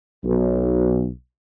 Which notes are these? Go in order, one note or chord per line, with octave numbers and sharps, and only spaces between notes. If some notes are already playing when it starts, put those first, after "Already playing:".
B1